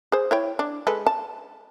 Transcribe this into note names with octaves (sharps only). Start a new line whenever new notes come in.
G#4 C5
E4 C#5 G5
D4
G#3 A4 B4
A5